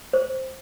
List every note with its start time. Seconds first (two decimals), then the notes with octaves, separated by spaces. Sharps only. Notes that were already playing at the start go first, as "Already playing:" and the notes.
0.13 C5